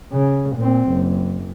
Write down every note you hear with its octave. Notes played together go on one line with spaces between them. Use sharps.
C#3
A#2 C4
F#1